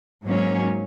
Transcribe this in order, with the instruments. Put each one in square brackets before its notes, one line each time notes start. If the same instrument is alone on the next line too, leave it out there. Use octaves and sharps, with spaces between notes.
[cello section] G#2 F#3 A#3 C#4